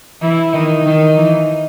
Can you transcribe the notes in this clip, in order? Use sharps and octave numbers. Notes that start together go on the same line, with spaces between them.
E3 E4
D#3 D#4
D#3
E3